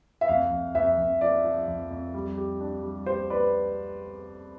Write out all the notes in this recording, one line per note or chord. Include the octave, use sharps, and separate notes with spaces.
E5
F2 F5
F2
F2 E5
F2
F3 D5
F3
F2
F2
G3
G4
D4
G3
G4 C5
B4 D5